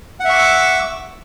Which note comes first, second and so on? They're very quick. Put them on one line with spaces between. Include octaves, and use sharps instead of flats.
F#5 E5 C#6 D6 E6